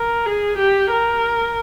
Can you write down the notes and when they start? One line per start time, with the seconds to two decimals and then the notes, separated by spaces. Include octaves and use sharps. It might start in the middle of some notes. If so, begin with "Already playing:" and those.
Already playing: A#4
0.26 G#4
0.58 G4
0.91 A#4